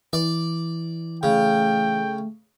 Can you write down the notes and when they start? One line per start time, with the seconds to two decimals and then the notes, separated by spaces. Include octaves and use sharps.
0.13 E3 D5
1.23 C#3 A3 G5